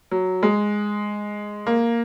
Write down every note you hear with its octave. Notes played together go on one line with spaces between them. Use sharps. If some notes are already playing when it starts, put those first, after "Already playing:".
F#3
G#3
A#3